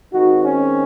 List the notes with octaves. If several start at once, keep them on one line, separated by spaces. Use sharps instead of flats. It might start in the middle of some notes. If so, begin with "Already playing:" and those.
D#3 G#3 C4 D#4 F#4
C#4